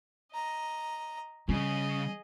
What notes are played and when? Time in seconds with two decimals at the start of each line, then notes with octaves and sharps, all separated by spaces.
0.32 D#5 A#5
1.49 C#3 G3 G#4 D#5